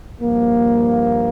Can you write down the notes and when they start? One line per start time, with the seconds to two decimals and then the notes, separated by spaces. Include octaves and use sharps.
0.21 G2 F3 A#3